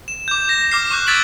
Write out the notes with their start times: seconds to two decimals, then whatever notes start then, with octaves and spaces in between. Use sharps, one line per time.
0.08 E7
0.28 D6 G6
0.49 A#6
0.71 D6 F6 C7
0.91 C#6 D6 F#6 G6
1.07 E6 G#6 A6 B6 D7 F#7